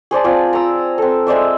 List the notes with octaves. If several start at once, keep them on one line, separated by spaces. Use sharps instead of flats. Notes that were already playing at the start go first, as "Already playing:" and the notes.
G#4 C5 D5 A5
C4 F4 G#4 D5
A#5 E6
C4 A4
G#3 C5 D5 E5